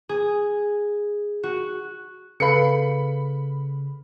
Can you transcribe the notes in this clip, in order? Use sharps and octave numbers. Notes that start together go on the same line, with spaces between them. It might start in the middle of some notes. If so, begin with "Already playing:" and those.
G#4
F#4
C#3 A4 B4 F5 B5 C#7